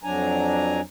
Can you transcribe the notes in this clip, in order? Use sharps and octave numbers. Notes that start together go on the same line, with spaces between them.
F2 F#3 D4 G#5 A#5